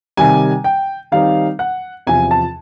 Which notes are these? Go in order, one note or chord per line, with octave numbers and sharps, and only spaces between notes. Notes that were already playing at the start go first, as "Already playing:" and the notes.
C3 D#3 G3 G#5
G5
D#3 G3 C4 D#4 F5
F#5
E2 C3 F3 G#5
A5